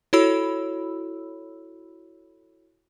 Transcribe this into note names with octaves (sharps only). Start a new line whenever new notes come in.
E4 F#4 A4 C#5 B5 E6